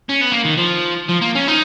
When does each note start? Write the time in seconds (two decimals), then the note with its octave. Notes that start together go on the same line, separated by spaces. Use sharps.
0.09 C#4
0.21 B3
0.32 A#3
0.45 D#3
0.57 F3
1.09 F3
1.22 A#3
1.35 C#4
1.48 D#4